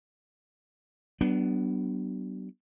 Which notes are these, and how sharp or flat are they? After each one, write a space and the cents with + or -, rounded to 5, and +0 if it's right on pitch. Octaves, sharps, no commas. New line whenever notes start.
F#3 +45 B3 +0 D4 +5